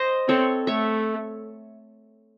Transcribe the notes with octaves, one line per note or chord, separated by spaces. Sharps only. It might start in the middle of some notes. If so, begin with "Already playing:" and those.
Already playing: C5 D#5
C4 A4 C#5
A3 C#5 E5